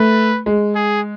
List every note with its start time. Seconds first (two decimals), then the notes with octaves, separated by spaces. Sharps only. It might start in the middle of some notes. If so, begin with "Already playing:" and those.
Already playing: A3 B4
0.46 G#3
0.75 G#4